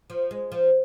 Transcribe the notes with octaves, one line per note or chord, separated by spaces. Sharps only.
F3
G#3
F3